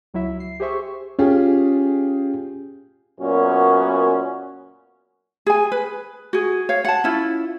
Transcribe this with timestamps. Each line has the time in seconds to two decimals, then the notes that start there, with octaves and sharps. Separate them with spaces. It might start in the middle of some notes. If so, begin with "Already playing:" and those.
0.14 C#2 F#3 E4 E5
0.40 C7
0.60 G4 G#4 C5 E5 C#6
1.19 C#4 F4 G4 G#4
3.20 F#2 A#2 B3 C#4 F#4
5.46 G#4 G#5
5.72 B4
6.33 F#4 G#4
6.69 C#5 F5
6.85 F#5 A5
7.04 C#4 E4 F4